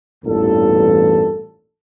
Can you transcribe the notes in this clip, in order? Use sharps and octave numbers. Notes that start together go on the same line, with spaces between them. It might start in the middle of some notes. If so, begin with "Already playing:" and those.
A1 E2 G2 A#2 A4